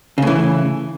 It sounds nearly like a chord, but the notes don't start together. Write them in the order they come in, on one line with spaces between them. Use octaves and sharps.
C#3 A2 E3